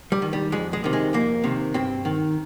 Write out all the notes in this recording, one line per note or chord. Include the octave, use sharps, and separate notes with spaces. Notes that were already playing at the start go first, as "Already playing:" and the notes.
G3
D#3
G3
F2 G#3
G#3
C3 D#3
G#3
F2 A#3
C3 D#3
G2 C4
D#3